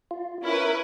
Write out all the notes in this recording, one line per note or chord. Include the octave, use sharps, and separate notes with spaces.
F4
C#4 E4 A#4 B4